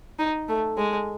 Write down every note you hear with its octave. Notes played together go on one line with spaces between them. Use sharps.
D#4
A3
G#3